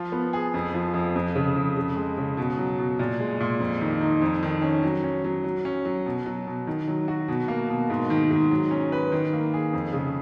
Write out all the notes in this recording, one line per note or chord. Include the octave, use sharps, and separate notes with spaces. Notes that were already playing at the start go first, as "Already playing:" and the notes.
Already playing: F3 F4
B3
G#4
F2
F3
F2
F2
C#3
F2
C#3
G#3
C#3
B2
F#3
B2
A#2
G#3
A#2
F2
D#3
D#4
F2
D#3
C#4
F#3
C#4
F#3
F#3
C#4
F#3
B2
F#3
B2
D#3
F#3
F#4
B2
A#3
B2
G#2
D#3
G#2
F#3
C#4
B4
D#3
A#3
G#4
F2
C#3